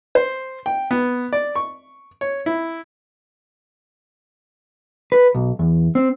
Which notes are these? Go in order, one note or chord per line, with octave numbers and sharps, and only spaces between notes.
C5
G5
B3
D5
C#6
C#5
E4
B4
B1
E2
C4